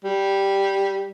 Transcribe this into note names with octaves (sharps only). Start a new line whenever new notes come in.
G3